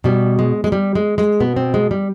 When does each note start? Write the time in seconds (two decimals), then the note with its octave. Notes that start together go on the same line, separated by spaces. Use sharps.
0.04 B2 G3
0.39 G#3
0.64 G#3
0.72 G3
0.95 G#3
1.18 G#3
1.40 B2 B3
1.56 C4
1.74 G#3
1.91 G3